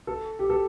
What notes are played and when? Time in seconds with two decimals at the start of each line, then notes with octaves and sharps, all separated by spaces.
0.07 A4
0.39 G4
0.50 A4